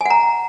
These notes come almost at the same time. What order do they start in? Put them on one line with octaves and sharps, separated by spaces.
G#5 F#5 A#5